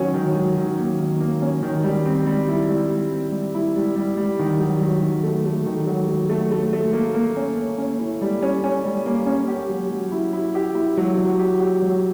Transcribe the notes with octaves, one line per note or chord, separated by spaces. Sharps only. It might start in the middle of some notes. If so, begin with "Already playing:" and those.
Already playing: D#3 F#3 C#4
D#3
F#3
D#3
A#3
D#3
A#3
C#4
D#3
G3
C4
G3
E4
G3
G3
C4
G3
E4
G3
G3
G3
D#3
F#3
F#3
D#3
A3
A3
D#3
F#3
F#3
A3
A3
A3
A#3
A#3
C#4
A#3
C#4
E4
G3
C#4
C#4
G3
A#3
C#4
G4
F#3
F#3
E4
E4
G4
E4
F#3
F#3
G4
G4
F#3